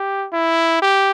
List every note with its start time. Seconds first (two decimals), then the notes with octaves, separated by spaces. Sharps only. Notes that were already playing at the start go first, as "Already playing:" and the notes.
Already playing: G4
0.33 E4
0.82 G4